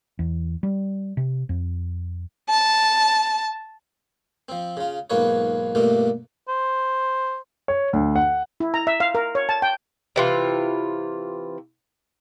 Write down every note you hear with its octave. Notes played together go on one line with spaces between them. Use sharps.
E2
G3
C3
F2
A5
F3 C4
C#3 F4
B1 G#2 A#3 F4 B4 C#5
G2 B2 A3 A#3 F4
C5
C#5
D2
F#5
E4
A#5
E5
F5
A#4
C#5
A5
G5
C3 E3 F4